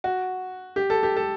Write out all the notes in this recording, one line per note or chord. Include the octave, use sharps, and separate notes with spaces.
F#4
G4
A4
G4
A4